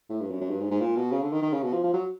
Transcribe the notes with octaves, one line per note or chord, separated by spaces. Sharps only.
A2
G2
F#2
F#2
G2
G#2
G#2
A#2
B2
C#3
D3
D#3
D#3
C#3
B2
F3
F3
F#3